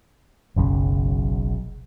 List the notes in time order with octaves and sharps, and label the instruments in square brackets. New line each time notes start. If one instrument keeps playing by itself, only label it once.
[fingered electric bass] F#1 B1 F#2 C#3